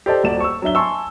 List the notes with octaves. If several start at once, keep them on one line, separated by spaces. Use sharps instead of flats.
G4 A4 C5 D5 D#5 A5
D#1 F#4 D5 E7
C#6 E6
F#3 D4 E5 G7
G#5 A5 C6 C#6 E6